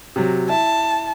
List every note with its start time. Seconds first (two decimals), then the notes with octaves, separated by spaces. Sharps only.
0.16 C3 F#3
0.50 E4 A5